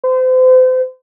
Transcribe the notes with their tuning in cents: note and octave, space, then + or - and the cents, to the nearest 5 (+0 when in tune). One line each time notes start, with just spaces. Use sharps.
C5 -35